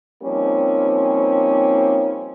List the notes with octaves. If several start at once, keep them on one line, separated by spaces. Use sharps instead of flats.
F3 G3 A#3 C4 C#4 D#4